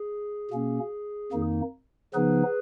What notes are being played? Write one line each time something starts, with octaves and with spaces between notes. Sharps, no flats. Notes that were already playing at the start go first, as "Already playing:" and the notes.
Already playing: G#4
B2 A#3 C#4
F2 D#3 A#3 D#4
C#3 F3 B3 D#4 G#4 B4